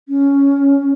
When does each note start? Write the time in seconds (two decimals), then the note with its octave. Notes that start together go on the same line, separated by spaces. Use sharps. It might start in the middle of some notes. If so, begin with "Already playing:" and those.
0.09 C#4